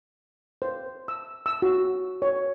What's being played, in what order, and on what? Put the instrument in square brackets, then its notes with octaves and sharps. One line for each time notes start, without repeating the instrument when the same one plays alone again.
[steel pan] C5
E6
E6
F#4
C#5